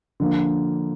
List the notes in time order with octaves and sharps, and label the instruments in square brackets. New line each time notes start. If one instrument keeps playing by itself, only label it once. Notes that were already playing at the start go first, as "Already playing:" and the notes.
[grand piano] D3 F3 A#3